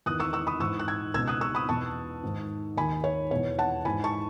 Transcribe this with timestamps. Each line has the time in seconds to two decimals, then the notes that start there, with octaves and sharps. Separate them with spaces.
0.06 E2 D#3 D#6 F#6
0.20 C#6 E6
0.33 C#6 E6
0.47 B5 D#6
0.60 G#2 E3 C#6 E6
0.79 F#6
0.88 E6 G#6
1.14 C#2 B2 E6 G#6
1.28 D#6 F#6
1.41 C#6 E6
1.55 B5 D#6
1.69 E2 B2 A5 C#6
2.23 G#2 D#3
2.76 D#2 D#3 G#5 B5
3.04 C#5
3.31 E2 B2 C#5
3.58 F#5 A5
3.85 G#2 E3 G#5 B5
4.04 A5 C#6